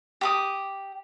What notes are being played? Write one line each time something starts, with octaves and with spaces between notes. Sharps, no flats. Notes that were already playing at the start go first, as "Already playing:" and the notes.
G4 D6 D#6